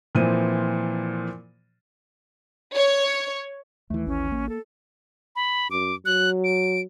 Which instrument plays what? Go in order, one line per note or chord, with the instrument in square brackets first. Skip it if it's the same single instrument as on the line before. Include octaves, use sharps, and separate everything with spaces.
[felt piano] A#2 E3 F3 C4 C5 D#7
[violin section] C#5
[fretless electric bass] D#2 E3 [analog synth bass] A3
[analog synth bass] A1 [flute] C#4
[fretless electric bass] A#3
[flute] A4
[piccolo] B5
[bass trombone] F#2 [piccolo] D6
[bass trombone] F#3 [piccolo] F#6
[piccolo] D7